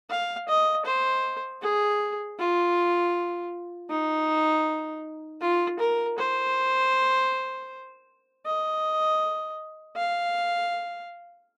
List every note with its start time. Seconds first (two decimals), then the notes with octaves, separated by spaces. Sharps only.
0.10 F5
0.48 D#5
0.85 C5
1.62 G#4
2.38 F4
3.90 D#4
5.41 F4
5.80 A#4
6.18 C5
8.46 D#5
9.97 F5